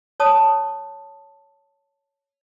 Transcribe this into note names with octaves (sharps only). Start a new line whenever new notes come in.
C#5 A5 D#6